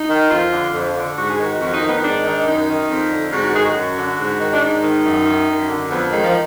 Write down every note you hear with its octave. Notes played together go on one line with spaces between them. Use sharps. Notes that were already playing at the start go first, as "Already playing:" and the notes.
Already playing: D#4
D#3
F2 F4
D3
F2
D3
G#2 F#4
G#4
D#3 F#4
F2 F#4
D#4
D#3
B3
D#4
G#2 D4
D#3
D4
F#2 D#4
D#3
F2
D3
G#2 F#4
F#4
D#3 G#4
F#4
F#2
D3
G#2
D#3
D4
G#2 D#4
D#3
F#2
D#3
F#2
D3
F2 B3
D#3 G#3
F3